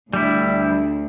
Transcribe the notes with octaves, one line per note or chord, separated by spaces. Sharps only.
D2 G3 E4